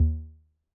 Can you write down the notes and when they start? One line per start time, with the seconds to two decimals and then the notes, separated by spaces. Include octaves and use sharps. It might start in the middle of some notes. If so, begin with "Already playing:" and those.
Already playing: D#2